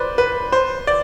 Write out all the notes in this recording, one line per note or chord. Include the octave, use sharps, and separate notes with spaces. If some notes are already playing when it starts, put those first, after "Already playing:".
Already playing: B4 C5 D5
B4
C5
D5